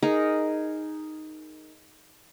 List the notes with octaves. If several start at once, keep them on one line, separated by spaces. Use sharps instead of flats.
D#4 G#4 A#4